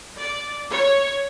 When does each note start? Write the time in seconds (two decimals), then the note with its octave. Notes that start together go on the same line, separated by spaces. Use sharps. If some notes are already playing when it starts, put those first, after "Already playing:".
0.19 D5
0.70 C#5